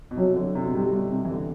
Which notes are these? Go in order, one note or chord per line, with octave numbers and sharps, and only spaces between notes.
B2
C3 F#3
D3
C3
B2
C3 G3
C3
B2
C3
E3
D3